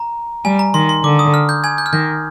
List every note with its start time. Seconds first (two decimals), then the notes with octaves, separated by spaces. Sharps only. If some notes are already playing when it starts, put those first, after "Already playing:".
Already playing: A#5
0.44 G3 G#5
0.59 A#5
0.74 D#3 C6
0.89 C6
1.04 D3 D6
1.19 D#6
1.34 F6
1.49 G6
1.64 G#5 G#6
1.78 G6
1.86 F6
1.93 D#3 G6